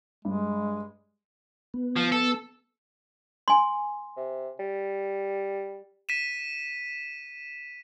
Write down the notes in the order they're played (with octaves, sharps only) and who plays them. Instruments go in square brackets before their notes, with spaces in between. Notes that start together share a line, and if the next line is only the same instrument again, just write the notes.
[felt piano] G2 [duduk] G#3
[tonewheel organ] B3
[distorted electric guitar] F3
A4
[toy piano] G#5 C6
[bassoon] C3
G3
[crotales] B6 D#7 E7